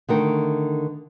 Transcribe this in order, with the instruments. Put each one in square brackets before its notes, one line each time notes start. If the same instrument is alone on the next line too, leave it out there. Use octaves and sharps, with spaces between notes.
[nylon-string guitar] D3 D#3 A3 A#4